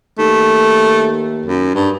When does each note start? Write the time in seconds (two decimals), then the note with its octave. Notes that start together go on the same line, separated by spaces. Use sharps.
0.19 D#2 A3
1.46 F#2
1.75 G2